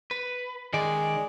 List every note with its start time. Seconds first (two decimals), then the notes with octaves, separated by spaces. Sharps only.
0.11 B4
0.73 D#3 G#3 D5